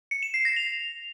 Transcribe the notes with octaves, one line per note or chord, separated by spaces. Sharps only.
C#7
E7
C7
A#6
F7